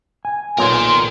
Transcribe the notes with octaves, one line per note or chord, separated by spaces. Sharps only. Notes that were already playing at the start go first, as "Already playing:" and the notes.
G#5
B1 A#2 A#4 G5 C6